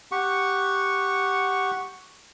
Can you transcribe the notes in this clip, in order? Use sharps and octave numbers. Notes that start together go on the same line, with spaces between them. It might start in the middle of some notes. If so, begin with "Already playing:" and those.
G4 F#5 C#6